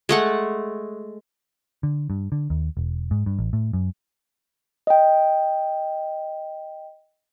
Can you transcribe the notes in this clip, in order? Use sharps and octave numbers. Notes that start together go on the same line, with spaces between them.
G#3 A3 F#5
D3
G2
D3
D#2
E1
G#2
G2
A1
A2
F#2
D#5 G5